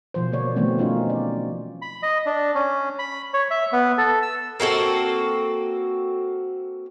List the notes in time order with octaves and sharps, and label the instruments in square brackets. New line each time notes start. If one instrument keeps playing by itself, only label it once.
[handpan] B2 F3 C5
D3 A#3 C#5 D5
D#3 E3 F#3 A3 B3 C4
C#4 D#4 F4 C#5
D5
[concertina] B5
D#5
D4
C#4
B5
C#5
E5
B3
A4
E6
[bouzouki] A#3 C4 F#4 A4